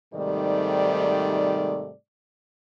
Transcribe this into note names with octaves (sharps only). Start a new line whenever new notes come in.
G#2 C3 D#3 G3 A3 D5